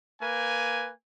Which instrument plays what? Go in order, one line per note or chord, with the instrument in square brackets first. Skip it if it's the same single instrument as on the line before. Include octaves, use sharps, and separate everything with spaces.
[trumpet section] A#3 B4 G#5